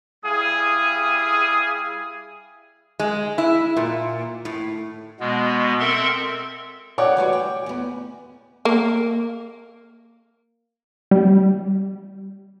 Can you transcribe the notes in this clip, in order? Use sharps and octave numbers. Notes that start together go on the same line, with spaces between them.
G3 E4 G#4 F5 D#6
G#3
E4
A#2
A2
B2 G#3 B3
C4 A4 A#4 E5 C6
C#5 D5 F#5 G5 D6
E3 G3 F#4
G5
E2 B3
A#3
G3